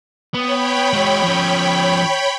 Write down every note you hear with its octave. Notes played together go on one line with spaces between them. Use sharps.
B3 C#5 G5 B5
G#3 F#4
F3 C#4